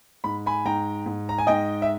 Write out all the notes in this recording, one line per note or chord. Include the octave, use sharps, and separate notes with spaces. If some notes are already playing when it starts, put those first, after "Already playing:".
G#2 B5
G#5 B5
G#2 G5 A#5
G#2
A#5
G#5
G#2 D#5 G5
E5